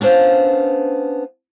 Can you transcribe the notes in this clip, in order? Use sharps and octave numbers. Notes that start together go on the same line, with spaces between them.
B3 C#4 D4 C5 F5